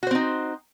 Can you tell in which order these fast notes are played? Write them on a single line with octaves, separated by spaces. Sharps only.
F#4 C5 C4 D#4